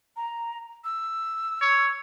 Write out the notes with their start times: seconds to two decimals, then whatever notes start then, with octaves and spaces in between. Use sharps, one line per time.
0.16 A#5
0.84 E6
1.62 C#5